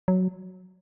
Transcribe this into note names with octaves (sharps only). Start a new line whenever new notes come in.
F#3